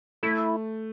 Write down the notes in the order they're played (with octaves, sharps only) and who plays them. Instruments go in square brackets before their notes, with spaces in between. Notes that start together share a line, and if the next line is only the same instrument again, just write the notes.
[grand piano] A3 [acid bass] E4